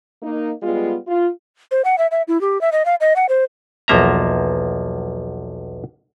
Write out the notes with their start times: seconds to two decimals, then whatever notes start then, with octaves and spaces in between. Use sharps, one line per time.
0.23 A#3 D#4
0.63 G3 G#3 B3 F4
1.07 F4
1.71 C5
1.85 F#5
1.98 E5
2.11 E5
2.28 E4
2.41 G4
2.61 E5
2.72 D#5
2.86 F5
3.01 D#5
3.16 F#5
3.29 C5
3.88 B1 E2 F3 A#3 E5 A#5